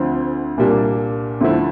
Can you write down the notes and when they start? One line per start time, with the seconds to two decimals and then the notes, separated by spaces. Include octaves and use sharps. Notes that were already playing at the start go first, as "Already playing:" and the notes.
Already playing: D2 D3 F3 C4
0.57 C2 A#2 G3 A#3 D4
1.41 D2 D3 F3 A3 E4